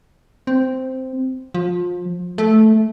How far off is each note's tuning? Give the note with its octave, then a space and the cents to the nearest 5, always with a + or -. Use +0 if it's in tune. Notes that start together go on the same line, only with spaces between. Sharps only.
C4 -5
F3 +25
A3 -10